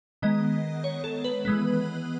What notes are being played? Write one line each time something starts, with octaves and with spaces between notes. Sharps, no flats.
D#3 G#3 B3 D#5
C#5
A4
B4
E3 G#3 B3